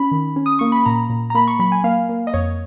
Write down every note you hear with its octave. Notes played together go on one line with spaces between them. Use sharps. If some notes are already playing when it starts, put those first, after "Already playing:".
Already playing: C#4 B5
D#3
C#4
D#6
A#3 C#6
B5
A#2 A#5
A#2
A#5
A#3 B5
C#6
F#3 B5
G#5
A#3 F5
A#3
D#5
F2 C#5